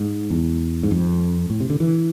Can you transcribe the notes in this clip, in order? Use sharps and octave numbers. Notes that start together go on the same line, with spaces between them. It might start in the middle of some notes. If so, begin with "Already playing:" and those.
Already playing: G#2
E2
G#2
F2
A2
C3
D3
E3